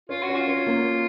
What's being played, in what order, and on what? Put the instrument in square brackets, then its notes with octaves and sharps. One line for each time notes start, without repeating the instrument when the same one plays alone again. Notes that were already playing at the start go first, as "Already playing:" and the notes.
[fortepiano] C#4 [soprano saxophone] F4
[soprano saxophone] F#4
[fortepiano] C#4
[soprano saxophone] F4
[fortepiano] C#4
A#3